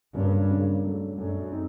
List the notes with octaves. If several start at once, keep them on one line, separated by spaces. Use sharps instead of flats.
G2 C#3 F#3 A#3 C#4
C#3 F#3 A#3 C#4
F#3 A3 D4
F#2 F#3 A3 D4
C4 D#4